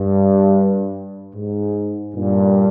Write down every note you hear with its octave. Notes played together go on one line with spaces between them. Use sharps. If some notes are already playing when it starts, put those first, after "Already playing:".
Already playing: G2
G#2
G2 A#2